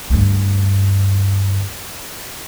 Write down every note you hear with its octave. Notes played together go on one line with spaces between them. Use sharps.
D2 G2